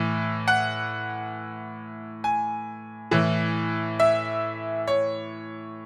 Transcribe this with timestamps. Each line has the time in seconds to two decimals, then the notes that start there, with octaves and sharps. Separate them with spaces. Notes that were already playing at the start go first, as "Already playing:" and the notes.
Already playing: A2 E3
0.48 F#5
2.24 G#5
3.11 A2 E3
4.00 E5
4.87 C#5